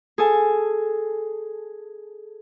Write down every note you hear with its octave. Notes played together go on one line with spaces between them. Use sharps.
G#4 A4 G#5